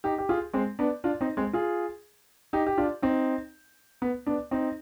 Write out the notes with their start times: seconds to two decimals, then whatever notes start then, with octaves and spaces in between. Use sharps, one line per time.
0.04 D#4 G4
0.18 G4
0.29 F4 G#4
0.53 G#3 C4
0.79 B3 D4
1.04 D4 F4
1.21 C4 D#4
1.37 G#3 C4
1.53 F4 G#4
2.53 D#4 G4
2.67 G4
2.78 D4 F4
3.02 C4 D#4
4.02 B3
4.26 B3 D4
4.51 C4 D#4